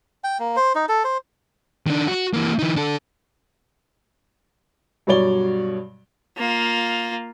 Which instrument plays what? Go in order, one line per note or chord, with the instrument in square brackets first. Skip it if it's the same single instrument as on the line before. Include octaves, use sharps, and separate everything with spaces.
[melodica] G5
A#3
C5
D#4
A4
C5
[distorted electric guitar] D#3 D4
F#4
E3 A#3
E3 D#4
D4 A4
[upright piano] G2 B2 F#3 C#5 D5 G7
[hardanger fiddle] A#3 F4